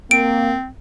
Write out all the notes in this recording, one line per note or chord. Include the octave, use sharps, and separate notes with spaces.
A#3 C4 D7